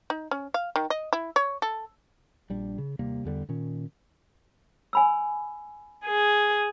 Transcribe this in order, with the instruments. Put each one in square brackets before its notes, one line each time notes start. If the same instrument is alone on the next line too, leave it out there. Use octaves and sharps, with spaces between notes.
[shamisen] D#4
C#4
F5
D#3
D#5
E4
C#5
A4
[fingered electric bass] A#1 G3 D4
C#3
D#2 C3 G3 A#3
E2 D3 G3
A#2 D#3 C#4
[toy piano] G#5 B5 E6
[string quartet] G#4